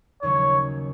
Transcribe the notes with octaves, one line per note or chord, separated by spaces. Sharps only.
D#2 C#3 F#3 C#5